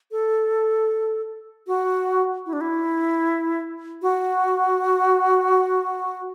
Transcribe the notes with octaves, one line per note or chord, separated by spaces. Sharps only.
A4
F#4
E4
D4
E4
F#4